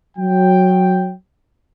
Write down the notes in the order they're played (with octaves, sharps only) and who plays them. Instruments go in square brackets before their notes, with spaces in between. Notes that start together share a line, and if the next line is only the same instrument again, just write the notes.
[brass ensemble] F#3 G5